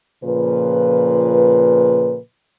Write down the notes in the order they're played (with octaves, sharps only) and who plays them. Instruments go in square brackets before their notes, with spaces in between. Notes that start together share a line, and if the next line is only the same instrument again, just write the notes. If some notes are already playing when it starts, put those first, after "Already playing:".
[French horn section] A#2 C#3 F3 B4